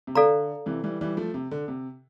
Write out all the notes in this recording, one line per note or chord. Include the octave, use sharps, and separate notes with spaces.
C3
D3 A4 D5 F5 A#5
C3 E3
E3 G3
E3 G3
F3 A3
C3
D3
C3